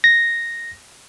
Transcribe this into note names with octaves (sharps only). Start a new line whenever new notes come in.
A#6